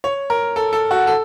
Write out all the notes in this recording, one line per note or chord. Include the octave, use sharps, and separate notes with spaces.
C#5
A#4
A4
A4
F#4
A4